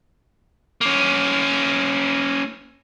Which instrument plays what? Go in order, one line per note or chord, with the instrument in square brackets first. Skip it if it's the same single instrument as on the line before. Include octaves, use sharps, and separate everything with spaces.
[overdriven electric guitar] A#3 C#4